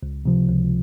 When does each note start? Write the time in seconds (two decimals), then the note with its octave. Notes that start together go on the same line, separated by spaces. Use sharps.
0.03 C#2
0.25 C3 F3
0.48 C#2